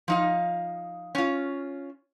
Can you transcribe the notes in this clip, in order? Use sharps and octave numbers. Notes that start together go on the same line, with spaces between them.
F3 D#4 F5
C#4 F4